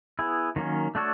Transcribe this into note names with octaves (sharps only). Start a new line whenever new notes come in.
B3 E4 G#4
D#3 F#3 A#3 C#4
A3 D4 F#4 A4 C#5